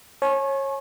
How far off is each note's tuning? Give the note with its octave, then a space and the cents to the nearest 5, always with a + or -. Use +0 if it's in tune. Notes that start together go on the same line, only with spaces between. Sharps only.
C#5 -25 G#5 +40